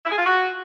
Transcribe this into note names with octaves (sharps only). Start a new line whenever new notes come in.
E4
G#4
F4
F#4